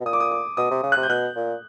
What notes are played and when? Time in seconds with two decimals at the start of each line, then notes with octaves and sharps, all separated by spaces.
0.01 B2
0.05 A#2 D#6
0.13 D6
0.20 D#6
0.32 D6
0.57 B2 D#6
0.71 C3
0.83 C#3
0.92 F#6
0.97 C3
1.03 G6
1.09 B2 F#6
1.36 A#2